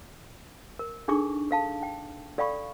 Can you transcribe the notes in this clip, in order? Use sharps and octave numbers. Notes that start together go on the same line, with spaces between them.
A#4
D4 D#4 G#4 A4 C#6 D6
A4 F5 A5
G5
A4 D5 F5 G5 B5 C#6